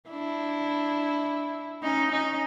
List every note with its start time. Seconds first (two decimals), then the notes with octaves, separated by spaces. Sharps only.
0.09 D4 E4
1.82 C#4 D#4
2.11 C#4 D#4